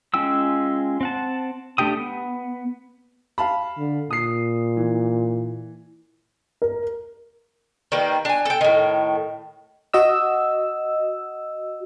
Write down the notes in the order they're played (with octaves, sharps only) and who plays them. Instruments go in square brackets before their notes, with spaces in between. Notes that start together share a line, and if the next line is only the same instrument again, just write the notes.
[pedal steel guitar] G#3 C#4 F4 G5 E6
C4 F#5 A5
A3 D4 G4 G5 D#6
B3
[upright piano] F5 A5 B5
[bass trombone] D3
[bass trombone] A#2 [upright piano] D#6 C7
[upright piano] E3
[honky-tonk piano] A#4
[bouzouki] D#3 G3 A#3 B4
D4 G#5
A4 G5
A2 D#3
[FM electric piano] F#4 D#5 E6